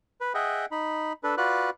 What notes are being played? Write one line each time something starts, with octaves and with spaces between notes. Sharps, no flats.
B4
G#4 D#5 E5 F#5 G5
D#4 B5
D4 A4 B4
F4 F#4 B4 D5 F#6